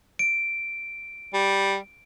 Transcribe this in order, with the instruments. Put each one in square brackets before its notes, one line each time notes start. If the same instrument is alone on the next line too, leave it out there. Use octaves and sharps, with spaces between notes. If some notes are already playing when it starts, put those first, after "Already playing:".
[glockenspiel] D7
[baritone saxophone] G3